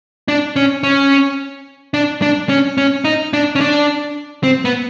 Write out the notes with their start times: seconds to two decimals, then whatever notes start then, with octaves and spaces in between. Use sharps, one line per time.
0.28 D4
0.56 C#4
0.83 C#4
1.94 D4
2.22 D4
2.49 C#4
2.78 C#4
3.04 D#4
3.33 D4
3.55 C#4
3.61 D4
4.43 C4
4.65 B3